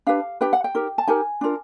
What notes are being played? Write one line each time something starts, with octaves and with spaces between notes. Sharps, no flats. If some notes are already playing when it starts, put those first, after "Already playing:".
D4 G4 B4 F5
D4 G4 B4 G5
F#5
G5
D#4 G4 A#4
A5
D#4 G4 A#4 G#5
D4 F4 A#4